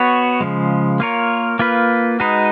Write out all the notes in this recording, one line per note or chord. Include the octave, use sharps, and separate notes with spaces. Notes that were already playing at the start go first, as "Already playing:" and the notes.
Already playing: B3 F#4 C#5
C#3 F3 G#3
A#3 F4 A#4 C#5
A#3 F4 B4
G#3 D#4 F#4 B4